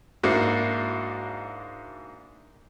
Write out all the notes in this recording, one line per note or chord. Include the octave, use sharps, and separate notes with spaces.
G#2 A#3 D4 E4 F#4